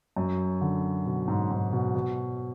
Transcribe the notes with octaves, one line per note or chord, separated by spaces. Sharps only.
F#2
D3
B2
G#2
G#2
B2
B2